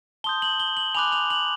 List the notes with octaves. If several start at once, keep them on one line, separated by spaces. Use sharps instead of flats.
A5 C6 D#6 G6 G7
F#7
G7
F#7
G#5 B5 D6 F#6 F7
F7
F#7